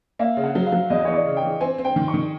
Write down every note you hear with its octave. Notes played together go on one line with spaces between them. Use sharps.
A#3 E5
C#3
F#5
F#3
F5
F#3
E2 D#5
E3 C#5
D5
C#3
G5
E3
C4 G#5
C4
G5
D#3
C#6
D#3